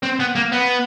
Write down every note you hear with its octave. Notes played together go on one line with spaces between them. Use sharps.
C4
B3
A#3
B3